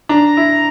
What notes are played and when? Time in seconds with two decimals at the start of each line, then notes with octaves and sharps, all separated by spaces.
0.09 D4 A#5
0.37 E4